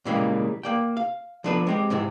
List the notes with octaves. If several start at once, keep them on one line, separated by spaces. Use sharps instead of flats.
A#2 C#3 E3 G3 G#3 A#3
A#3 D5 G5
F5
F3 B3 D4 A4 B4
G#3 C4 G4
G#2 C3 E3 C4